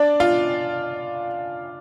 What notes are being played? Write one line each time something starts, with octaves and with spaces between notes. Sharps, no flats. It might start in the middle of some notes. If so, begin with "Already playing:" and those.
Already playing: D4 D5
F4 F5